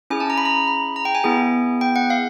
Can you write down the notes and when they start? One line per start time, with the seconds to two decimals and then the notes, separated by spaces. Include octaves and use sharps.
0.10 C#4 E4 G#4 G#5
0.20 A5
0.30 A#5
0.38 B5
0.45 A#5
0.68 B5
0.96 A#5
1.05 G5
1.15 G#5
1.24 B3 E4 G#4
1.81 G5
1.96 F#5
2.10 F5